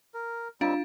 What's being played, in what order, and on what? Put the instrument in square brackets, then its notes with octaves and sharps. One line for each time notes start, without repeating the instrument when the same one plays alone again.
[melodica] A#4
[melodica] G3 C4 D#4 [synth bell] D4 [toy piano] F4 F5